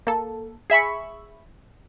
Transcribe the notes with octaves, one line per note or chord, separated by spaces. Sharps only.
A#3 A4
G#4 E5 B5 C#6